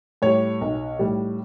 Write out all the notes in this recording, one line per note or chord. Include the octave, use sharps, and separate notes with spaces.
A2 G3 C#5
B1
A2 G3